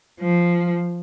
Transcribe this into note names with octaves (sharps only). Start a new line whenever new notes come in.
F3